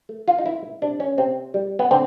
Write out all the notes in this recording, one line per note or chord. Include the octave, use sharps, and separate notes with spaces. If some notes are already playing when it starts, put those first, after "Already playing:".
A3
F4
D#4
E3 E4
C3 D4
C#4
C3 C4
G3
B3
D3 C4